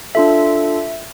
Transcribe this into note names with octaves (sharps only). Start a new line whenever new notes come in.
D4 F4 A4 E5